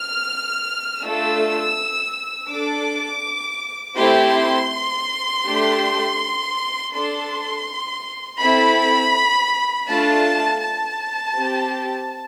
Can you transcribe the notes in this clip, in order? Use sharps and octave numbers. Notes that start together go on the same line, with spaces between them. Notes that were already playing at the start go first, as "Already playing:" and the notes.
Already playing: F6
A3 D4 F4 A4 E6
D4 A4 D6
A3 C4 E4 G4 C6
A3 D4 G4
D4 A4 C6
C4 E4 A4 B5
A3 D4 F4 A5
A5
C4 G4